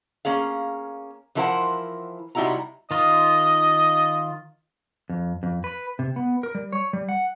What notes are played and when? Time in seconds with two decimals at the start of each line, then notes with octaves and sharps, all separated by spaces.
0.25 A#3 C#4 G#4 F5
1.35 E3 F3 E4 A#4 C5 F#5
2.35 C3 G3 D#4 E4 F#4 A#5
2.91 D#3 F4 D#5
5.09 F2
5.43 F2
5.64 B4
5.99 C3
6.16 B3
6.43 A#4
6.55 G3
6.72 C#5
6.93 G3
7.09 F#5